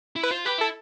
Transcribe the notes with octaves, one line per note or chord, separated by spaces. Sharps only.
E4
B4
F4 C5
G4 B4
E4 A4